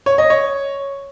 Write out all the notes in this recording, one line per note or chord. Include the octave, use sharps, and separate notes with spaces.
C#5
D#5
C#5